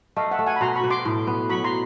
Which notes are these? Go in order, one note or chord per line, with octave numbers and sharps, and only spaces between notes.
A3 D#5 F5
E5 F#5
A3
F#5 G#5
B5
B2 A#5 C6
B5 C#6
B2
C6 D6
A2
B3
F#3 B5 C#6
A#5 C6